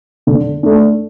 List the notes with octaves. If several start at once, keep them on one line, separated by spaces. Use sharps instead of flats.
D3
A3 D4